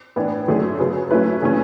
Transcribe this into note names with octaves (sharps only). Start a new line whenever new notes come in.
A2 E3 B3 D4
D3 F#3 A3 C#4 G#4
C#3 F#3 B3
F#3 A3 C#4 E4 B4
C#3 E3 A3 C#4